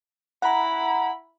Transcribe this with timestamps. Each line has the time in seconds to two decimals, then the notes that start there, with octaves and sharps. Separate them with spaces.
0.42 E4 F#5 A#5 B5